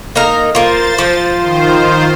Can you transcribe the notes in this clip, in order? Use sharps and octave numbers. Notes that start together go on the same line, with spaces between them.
A#3 D#4 A#4
A#3 F4 C5 A6
F3
D#3 F4 C5